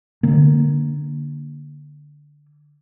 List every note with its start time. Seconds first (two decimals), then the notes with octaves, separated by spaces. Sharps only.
0.23 D3 A#3